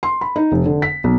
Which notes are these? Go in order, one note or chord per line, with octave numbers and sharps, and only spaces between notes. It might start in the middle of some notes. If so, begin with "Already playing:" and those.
C6
B5
D#4
F1
D3
B6
B1